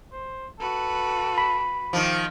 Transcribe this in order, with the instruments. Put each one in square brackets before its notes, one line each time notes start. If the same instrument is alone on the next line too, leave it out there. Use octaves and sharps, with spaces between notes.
[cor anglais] C5
[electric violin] F#4 B4 [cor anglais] A4
[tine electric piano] B5
[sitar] D#3 F3 [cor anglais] G4